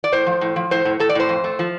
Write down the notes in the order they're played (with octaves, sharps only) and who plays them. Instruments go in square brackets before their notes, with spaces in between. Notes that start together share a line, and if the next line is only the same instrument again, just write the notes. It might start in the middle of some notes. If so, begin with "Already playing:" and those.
[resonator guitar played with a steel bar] D5
A2 C5
F3
A2
F3
A2 C5
A2
A2 A4
D5
A2 C5
F2
A3
F3